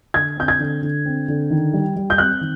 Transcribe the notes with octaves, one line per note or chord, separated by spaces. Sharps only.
D3 G#6
C4 G6
G#6
D3
D3
C4
D3
D#3
G3
G3
G6
C4 F#6
D#3